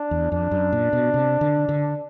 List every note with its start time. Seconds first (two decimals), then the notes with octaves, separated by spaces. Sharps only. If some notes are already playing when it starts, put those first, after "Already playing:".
Already playing: D4
0.11 E2
0.31 F2 D4
0.51 F#2
0.72 A#2
0.93 B2
1.14 C3
1.41 D3
1.69 D3